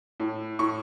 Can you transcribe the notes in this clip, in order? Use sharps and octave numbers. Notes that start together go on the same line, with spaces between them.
A2
A2 C#6